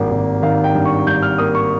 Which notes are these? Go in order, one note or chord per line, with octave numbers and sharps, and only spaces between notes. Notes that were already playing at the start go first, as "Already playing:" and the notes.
Already playing: G#1 G2 A#3
G#1
D#3 F5
G5
G2
C#6
G2 G6
F6
A#3 D#6
C#6